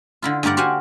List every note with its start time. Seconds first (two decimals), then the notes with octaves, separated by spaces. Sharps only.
0.22 D3 E4 F4
0.43 G2 A#3 G4 A#4 D5 F#5
0.57 F#4 G4 C5 F5 F#5 G#5